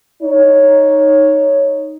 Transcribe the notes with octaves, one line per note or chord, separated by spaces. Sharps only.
D#4 C#5